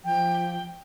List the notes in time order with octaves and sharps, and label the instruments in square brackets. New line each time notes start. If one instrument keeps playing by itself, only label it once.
[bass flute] F3 [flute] G5